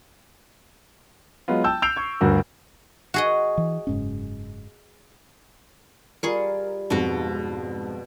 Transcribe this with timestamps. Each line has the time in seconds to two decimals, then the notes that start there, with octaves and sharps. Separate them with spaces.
1.48 F#3 G#3 B3 F4
1.64 G5 A5 E6 G6
1.82 E6 G6 C7 D7 F7
1.96 C#6 G#6
2.21 G1 D2 G2 F#4 A#4
3.14 F#4 G#4 D#5
3.58 E3
3.87 F#1 G#2 C#4
6.23 G3 F4 G#4 A#4 C#6
6.90 F2 G#2 B2 F#4